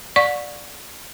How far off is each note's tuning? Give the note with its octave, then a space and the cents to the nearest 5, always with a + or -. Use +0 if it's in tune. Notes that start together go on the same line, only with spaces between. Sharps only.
D5 +0 F#5 -40 C#6 +0